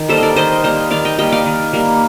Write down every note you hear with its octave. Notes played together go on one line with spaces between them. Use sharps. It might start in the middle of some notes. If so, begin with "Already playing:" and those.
Already playing: D#3
G3 A#3 A4 C5
D#5
A#4 D5
D#3 C5 D#5
G3 A#3 C5 D#5
D#3 D5 F5
D#5 G5
G3 A#3 D#5 G5
D5 F5
D#3
G3 A#3